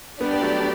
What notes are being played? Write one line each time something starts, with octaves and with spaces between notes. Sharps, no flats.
G3 B3 D4 G4 D5
B3
F#3 A3